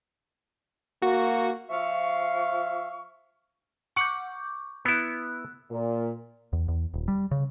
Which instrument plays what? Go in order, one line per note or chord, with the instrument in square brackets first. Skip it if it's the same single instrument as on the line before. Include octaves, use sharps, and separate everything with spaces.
[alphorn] A#3 [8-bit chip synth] F#4
[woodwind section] F3 E5 F5 C#6
[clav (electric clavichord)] F#5 [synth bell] C#6 D6 G6
[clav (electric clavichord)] B3 E4 [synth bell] E6 F#6
[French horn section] A#2
[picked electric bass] E2
E2
D#1
G3
C#3